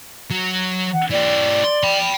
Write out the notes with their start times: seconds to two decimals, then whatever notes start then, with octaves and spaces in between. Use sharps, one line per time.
0.31 F#3
0.93 F#5
1.11 E3 G4 D5
1.64 C6
1.84 G5 B5